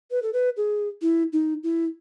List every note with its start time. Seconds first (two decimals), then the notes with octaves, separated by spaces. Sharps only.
0.11 B4
0.23 A4
0.33 B4
0.57 G#4
1.02 E4
1.33 D#4
1.63 E4